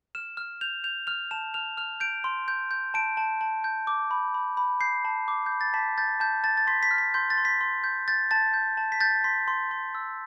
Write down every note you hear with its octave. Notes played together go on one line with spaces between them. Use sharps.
F6 E7
F6
G6 F7
G6 F7
F6 F7
A5 E7
F6 F7
F6 F7
G6 D7
C6
G6
G6
A5 D7
A5
A5
G6
D6
B5
B5
B5
G6 C7
A5
D6
G6
B5
A6
A5 B6
G6 A6
A5 G6
A5 A6
A6
C6 B6
B6
F6
B6
C6 G6
A6
C6
B6
C6
G6
G6 A6
A5 A6
G6
A5
B6
G6 A6
C6 B6
C6
C6
E6